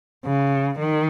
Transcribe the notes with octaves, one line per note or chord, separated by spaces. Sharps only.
C#3
D#3